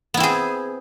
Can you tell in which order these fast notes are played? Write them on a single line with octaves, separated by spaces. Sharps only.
B3 E4 C4 G#4